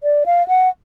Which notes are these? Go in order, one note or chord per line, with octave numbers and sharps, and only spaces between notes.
D5
F5
F#5